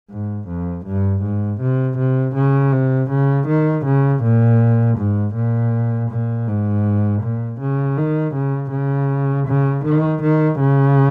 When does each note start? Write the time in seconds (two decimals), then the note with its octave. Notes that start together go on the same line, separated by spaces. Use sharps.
0.10 G#2
0.48 F2
0.86 G2
1.23 G#2
1.61 C3
1.98 C3
2.35 C#3
2.72 C3
3.10 C#3
3.48 D#3
3.85 C#3
4.23 A#2
4.98 G#2
5.35 A#2
6.10 A#2
6.47 G#2
7.22 A#2
7.60 C#3
7.97 D#3
8.35 C#3
8.72 C#3
9.47 C#3
9.85 D#3
10.22 D#3
10.60 C#3